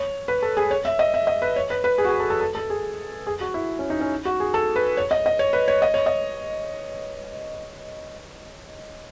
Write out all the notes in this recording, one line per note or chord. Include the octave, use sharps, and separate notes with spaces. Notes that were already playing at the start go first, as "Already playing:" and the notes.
Already playing: C#5
B4
A4
G#4
C#5
E5
D#5
E5
D#5
B4
C#5
B4
B4
G#4
F#4
G#4
A4
A4
A4
A4
G#4
G#4
F#4
E4
C#4
D#4
C#4
F#4
G#4
A4
B4
C#5
D#5
D#5
C#5
B4
C#5
D#5
C#5
D#5